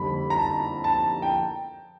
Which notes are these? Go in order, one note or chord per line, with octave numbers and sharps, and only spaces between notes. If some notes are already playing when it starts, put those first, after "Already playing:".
Already playing: F2 D3 G3 A#3 B5
A#5
A5
A5
G5